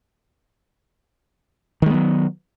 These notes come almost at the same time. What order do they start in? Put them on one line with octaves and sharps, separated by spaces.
D#3 G#3 B3 F#3